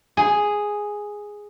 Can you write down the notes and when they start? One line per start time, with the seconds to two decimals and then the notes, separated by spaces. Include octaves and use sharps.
0.17 G#4